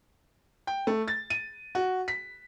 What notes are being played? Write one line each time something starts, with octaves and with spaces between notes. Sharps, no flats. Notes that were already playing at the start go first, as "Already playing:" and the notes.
G5
A3
A6
D#7
F#4
B6